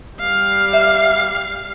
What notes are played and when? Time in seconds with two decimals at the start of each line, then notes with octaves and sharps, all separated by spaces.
0.19 G3 F5
0.73 E5